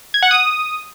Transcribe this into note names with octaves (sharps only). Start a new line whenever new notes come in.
G#6
F#5
D#6